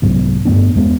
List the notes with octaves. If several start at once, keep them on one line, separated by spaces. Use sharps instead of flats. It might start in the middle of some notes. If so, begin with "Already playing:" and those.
C2 G#2 F#3 B3
G2 A3 B3 D4
E2 G#3 A#3 B3